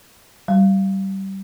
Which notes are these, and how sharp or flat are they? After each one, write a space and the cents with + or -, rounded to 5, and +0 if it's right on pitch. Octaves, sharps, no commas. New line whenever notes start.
G3 -20